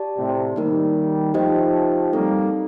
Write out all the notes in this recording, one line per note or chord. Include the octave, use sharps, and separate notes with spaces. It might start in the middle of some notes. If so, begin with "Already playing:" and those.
Already playing: G4 D5 A5
A2 C3
D#3 G3 A#3 D#4 A#4
F3 A3 D#4 G4 C5 D#5 G5
G3 A#3 C4 D#4 A4